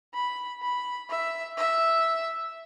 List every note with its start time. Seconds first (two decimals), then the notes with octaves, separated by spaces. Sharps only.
0.14 B5
0.62 B5
1.10 E5
1.57 E5